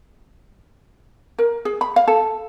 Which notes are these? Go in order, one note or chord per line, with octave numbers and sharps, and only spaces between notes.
A#4
G#4
B5
F5
A4